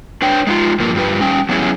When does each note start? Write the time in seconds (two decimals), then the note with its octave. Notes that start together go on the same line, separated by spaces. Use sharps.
0.22 D4 B4 C#5 G5
0.47 G#3 D#4 F4
0.80 G2 F3 A#3
0.95 G2 F3 G3 B4
1.21 G3 C#4 G5
1.49 F#3 B3 C#4 E4 G#4